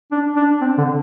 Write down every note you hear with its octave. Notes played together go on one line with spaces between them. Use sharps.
D4
D4
C4
D3